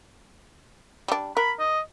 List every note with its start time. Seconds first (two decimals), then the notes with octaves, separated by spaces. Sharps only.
1.08 G3 D4
1.37 A#4 B5
1.59 D#5